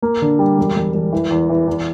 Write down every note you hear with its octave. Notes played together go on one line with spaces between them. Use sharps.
A#3
D3
G3
E1
E1
E1
E3
E2
E3
E2